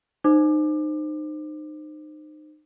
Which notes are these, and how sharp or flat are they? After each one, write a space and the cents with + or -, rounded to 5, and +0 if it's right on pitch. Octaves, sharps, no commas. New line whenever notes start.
D#4 -30 C5 +0 D6 +25